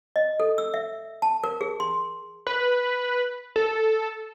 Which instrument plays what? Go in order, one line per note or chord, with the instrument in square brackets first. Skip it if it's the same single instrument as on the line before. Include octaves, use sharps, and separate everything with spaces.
[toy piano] D#5
A4
E6
E5
A5
A#4
G#4
C6
[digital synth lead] B4
A4